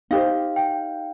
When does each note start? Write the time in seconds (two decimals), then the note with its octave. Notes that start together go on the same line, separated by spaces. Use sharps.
0.11 D#4 G4 C5 F5
0.56 G5